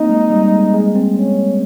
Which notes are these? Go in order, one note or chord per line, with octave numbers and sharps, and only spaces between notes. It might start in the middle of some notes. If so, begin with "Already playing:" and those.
Already playing: A#3 C4 D#4
G#3
G3
G#3
G#3
C4
C#4